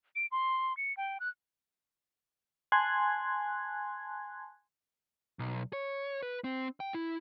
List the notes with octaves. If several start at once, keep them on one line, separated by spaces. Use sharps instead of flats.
D7
C6
C#7
G5
F#6
G#5 A5 C6 F#6 G#6
B1
C#5
B4
C4
G5
E4